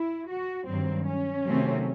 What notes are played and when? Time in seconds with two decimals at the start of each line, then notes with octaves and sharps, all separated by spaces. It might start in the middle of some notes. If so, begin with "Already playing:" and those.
Already playing: E4
0.29 F#4
0.68 G2 D#3 F#3 C4
1.06 C#4
1.46 C3 D#3 F#3 A3 C4